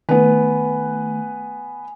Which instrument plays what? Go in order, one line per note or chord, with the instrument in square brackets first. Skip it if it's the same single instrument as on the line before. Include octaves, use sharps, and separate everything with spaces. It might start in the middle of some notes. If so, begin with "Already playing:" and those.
[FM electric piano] D#3 A3 [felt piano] B3 B4 [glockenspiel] G#5